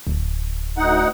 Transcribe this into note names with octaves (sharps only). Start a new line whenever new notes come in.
D1
D2 D#4 F#5